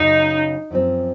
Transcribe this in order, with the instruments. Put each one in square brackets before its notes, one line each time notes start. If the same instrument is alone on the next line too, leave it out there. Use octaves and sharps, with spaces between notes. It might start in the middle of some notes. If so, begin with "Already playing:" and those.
Already playing: [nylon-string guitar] F#2 C#3 F#3 [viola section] D#4
[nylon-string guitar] F#2 F3 C4